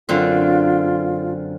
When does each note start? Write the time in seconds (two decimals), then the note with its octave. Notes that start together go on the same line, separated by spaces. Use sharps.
0.09 F#2 D3 C4 F4